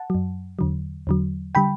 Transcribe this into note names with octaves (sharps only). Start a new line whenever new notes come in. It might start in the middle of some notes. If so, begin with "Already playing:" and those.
Already playing: F#5 A5
F#2 F#3
E2 D3 F#3
E2 D3 F#3
D3 G3 G5 B5